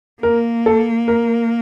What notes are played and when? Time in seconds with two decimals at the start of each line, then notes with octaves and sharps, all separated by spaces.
0.22 A#3 A#4
0.66 A4
1.08 A#4